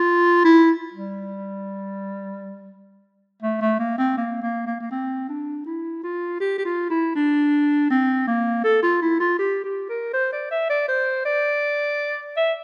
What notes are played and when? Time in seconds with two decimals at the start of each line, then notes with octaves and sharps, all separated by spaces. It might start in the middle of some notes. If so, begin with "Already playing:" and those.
Already playing: F4
0.45 E4
0.93 G3
3.42 A3
3.61 A3
3.79 A#3
3.98 C4
4.17 A#3
4.42 A#3
4.67 A#3
4.80 A#3
4.91 C4
5.29 D4
5.66 E4
6.03 F4
6.40 G4
6.58 G4
6.65 F4
6.90 E4
7.15 D4
7.90 C4
8.27 A#3
8.64 A4
8.83 F4
9.02 E4
9.20 F4
9.39 G4
9.64 G4
9.89 A#4
10.13 C5
10.32 D5
10.51 E5
10.70 D5
10.88 C5
11.25 D5
12.37 E5